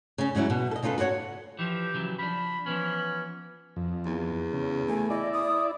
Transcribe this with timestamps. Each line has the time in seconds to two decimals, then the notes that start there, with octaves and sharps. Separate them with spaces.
0.18 C#3 C#4
0.35 G#2 C#3 F#3 E4
0.50 B2
0.71 A4 D#5
0.83 C#3 D#4 F4 A4 B4
0.98 F#4 A#4 B4 C#5 F#5
1.59 E3 F3 G4
1.94 C#3 E3 F#3
2.19 F3 D4 B5
2.66 E3 F3 B3 C#4
3.76 F2
4.06 E2
4.53 C#3
4.89 A3 G#5
5.10 E4 D5 D#5
5.33 D#6